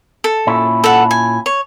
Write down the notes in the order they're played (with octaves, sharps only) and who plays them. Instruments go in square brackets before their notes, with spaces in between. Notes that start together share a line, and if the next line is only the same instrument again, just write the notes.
[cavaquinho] A4
[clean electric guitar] A#2 C#4 E4
[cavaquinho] A4 E5 F#5
G#5
C#5